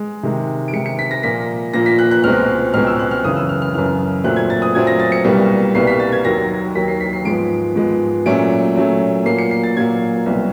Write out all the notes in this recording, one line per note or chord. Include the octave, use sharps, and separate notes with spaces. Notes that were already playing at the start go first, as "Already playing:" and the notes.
Already playing: G#3
C3 D#3 G#3
D7
C3 D#3 G#3 C#7
C#7
B6
A#6
A#2 F3 A#3 B6
A#2 F3 A#3 A#6
B6
F#6
F#6
C#2 B2 G#3 C4 F6
C#2 B2 G#3 C4 F6
E6
F#6
F6
F#2 C#3 E3 D#6
E6
F6
F6
F#2 C#3 E3 F6
A#2 F#3 A3 C4 F#6
G#6
A6
D#6
A#2 F#3 A3 C4 G#6
A#6
A6
C#7
C2 B2 G3 A#3
C2 B2 G3 A#3 C7
B6
A6
G#6
D#2 D#3 F#3 A#6
D#2 D#3 F#3 B6
C7
B6
C7
G#2 F3 G#3 B3 D7
G#2 F3 G#3 B3
A#2 F#3 A3 C#4 D7
A#2 F#3 A3 C#4
A#2 F#3 A#3 C7
C#7
C7
A6
A#2 F#3 A#3 G#6
C2 B2 F#3